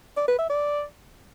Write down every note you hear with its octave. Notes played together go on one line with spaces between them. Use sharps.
D5
B4
E5
D5